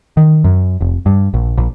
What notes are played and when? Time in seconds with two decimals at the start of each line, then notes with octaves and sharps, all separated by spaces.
0.17 D#3
0.44 F#2
0.81 F1
1.06 G2
1.34 A#1
1.58 A#1